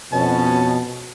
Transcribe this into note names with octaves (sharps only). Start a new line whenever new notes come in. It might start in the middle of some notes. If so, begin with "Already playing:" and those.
F2 B2 C#4 A5